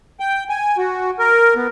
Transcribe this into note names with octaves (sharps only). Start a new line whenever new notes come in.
G5
G#5
F#4
A#4
B3